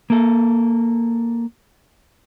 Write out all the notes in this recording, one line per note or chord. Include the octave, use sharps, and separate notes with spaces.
A#3 A4